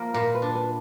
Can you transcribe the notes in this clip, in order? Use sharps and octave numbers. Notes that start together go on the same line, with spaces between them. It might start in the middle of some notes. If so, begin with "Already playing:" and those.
Already playing: F3 A#3
A#2 A#4
B4
D4
B4